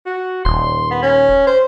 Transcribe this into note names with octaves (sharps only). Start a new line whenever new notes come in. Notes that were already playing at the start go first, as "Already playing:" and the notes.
F#4
D#1 C6
B3
C#4
C5